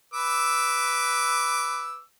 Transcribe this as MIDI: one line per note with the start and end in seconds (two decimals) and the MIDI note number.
0.14 2.01 71
0.14 2.01 86
0.14 2.01 88